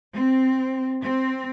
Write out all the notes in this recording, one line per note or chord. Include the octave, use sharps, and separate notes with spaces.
C4
C4